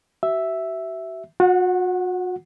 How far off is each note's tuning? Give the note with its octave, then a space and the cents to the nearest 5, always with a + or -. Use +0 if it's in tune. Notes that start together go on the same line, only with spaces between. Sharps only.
F#4 +40 E5 +0
F#4 -40 F#5 -5